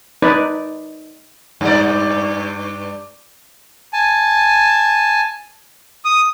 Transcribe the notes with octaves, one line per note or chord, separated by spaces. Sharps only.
D#4 B4 D5
G2 D5
G#5 A5
D#6